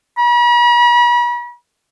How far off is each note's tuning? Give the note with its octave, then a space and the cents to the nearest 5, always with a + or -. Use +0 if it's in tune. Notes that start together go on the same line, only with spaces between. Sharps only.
B5 -45